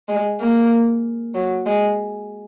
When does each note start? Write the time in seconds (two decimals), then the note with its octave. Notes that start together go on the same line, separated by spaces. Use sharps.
0.08 G#3
0.41 A#3
1.35 F#3
1.66 G#3